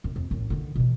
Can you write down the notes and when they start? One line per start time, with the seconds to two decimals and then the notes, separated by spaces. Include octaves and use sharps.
0.04 F#2
0.16 F2
0.31 A1 F#2
0.50 D3 D#3
0.75 B2 E3